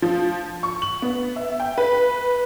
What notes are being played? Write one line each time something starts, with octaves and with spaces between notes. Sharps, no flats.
F3
C#6
F#7
B3
E5
G5
B4